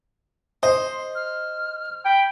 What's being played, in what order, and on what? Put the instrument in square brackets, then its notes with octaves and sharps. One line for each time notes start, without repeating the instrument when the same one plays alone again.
[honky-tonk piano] C5 [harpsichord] D#5 [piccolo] C6
[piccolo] F6
[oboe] G5 [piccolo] B5